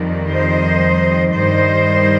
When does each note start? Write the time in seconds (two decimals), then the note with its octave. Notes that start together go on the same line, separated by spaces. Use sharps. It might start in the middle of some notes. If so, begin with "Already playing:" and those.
Already playing: F2 D#3 G3
0.29 C5 D#5
1.32 G2 D#3 G3 C5 D#5